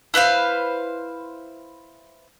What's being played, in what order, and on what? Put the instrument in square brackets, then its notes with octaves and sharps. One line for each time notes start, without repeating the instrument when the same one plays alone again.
[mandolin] E4 B4 C5 F5